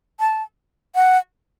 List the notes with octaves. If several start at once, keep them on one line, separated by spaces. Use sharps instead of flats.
A5
F#5